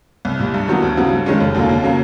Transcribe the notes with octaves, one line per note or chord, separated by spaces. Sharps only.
C2
A#2 G3
G2
D#3 F#3 B3
D2
C#3 F#3 B3
G2
D#3 G#3 C#4 F4
F1
D#2 D3 F#3 A#3
D#2
C#3 F#3 A#3